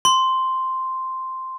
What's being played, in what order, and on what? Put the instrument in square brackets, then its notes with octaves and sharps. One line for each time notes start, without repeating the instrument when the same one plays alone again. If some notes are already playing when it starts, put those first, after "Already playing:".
[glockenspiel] C6